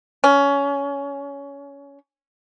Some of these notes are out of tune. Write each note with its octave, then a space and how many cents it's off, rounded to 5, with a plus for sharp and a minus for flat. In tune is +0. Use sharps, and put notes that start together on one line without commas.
C#4 +20